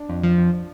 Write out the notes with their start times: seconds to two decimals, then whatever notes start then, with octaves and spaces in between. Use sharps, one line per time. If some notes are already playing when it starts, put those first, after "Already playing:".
Already playing: D4
0.09 F2
0.23 F3
0.38 F2